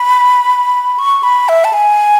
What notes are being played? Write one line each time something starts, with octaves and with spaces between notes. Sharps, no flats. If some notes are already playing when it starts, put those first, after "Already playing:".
Already playing: B5
C#6
B5
E5
A5
G#5